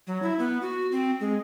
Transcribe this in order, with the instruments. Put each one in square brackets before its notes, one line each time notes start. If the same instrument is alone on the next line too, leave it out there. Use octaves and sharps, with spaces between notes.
[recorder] F#3
E4
B3
F#4
C4
G#3